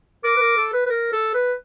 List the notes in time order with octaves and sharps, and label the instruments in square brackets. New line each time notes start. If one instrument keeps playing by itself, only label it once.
[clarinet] A#4 [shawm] D6
[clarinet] B4
A#4
A4
B4
B4
A#4
A4
B4